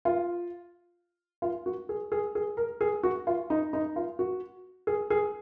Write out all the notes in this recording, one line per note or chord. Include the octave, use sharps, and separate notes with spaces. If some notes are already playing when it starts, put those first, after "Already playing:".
F4
F4
F#4
G#4
G#4
G#4
A#4
G#4
F#4
F4
D#4
D#4
F4
F#4
G#4
G#4